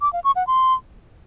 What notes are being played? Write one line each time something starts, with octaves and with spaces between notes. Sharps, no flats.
D6
F5
C#6
F#5
C6